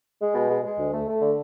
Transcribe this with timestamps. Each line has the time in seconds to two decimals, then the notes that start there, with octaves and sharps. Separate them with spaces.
0.20 G#3
0.34 B2
0.50 G#3
0.64 G#3
0.78 D2
0.92 A3
1.08 A3
1.22 D3